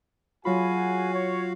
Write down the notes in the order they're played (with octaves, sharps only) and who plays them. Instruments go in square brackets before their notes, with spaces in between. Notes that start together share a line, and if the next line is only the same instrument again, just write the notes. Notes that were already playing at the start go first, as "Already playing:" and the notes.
[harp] F#3 B5 [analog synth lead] F4 [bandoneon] F#4 F5 [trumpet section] G#4 F#5 G#5
[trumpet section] C#5